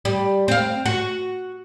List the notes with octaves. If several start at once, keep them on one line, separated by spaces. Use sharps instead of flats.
G3
C4 F5
F#4